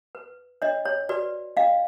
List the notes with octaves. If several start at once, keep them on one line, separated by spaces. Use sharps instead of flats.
B4
D4 C#5 D#5
C#5
F#4 B4 D5
D4 D#5 F5